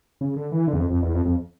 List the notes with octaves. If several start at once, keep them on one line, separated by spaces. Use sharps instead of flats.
C#3
D3
E3
D3
E2
F2
F2
E2
F2
F2